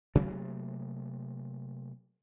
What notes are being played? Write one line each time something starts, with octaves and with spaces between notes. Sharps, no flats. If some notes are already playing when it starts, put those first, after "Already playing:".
C3 F#3 A3 A#3